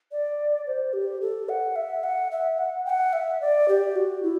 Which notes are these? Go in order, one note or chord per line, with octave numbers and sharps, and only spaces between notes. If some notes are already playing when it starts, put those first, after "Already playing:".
D5
C5
G4
A4
F#5
E5
F#5
E5
F#5
G5
F#5
E5
D5
G4
F#4
E4